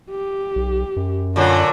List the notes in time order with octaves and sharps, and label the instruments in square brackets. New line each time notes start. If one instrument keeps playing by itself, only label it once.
[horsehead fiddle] G4
[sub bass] B1
F#2
[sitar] A#2 D3 F#3 [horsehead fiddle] F4